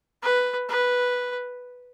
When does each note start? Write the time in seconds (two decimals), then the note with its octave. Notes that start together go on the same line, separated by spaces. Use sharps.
0.22 B4
0.69 B4